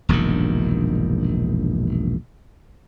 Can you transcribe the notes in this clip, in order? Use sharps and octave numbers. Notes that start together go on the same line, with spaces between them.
E1 A#1 G2 D#3